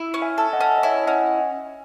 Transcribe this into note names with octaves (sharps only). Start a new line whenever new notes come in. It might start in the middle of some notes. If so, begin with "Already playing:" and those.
Already playing: E4
C#4
E5 G#5
A4
D#5 F#5
C#4
D#5
E4 C#5 E5
C#4 D#5 F#5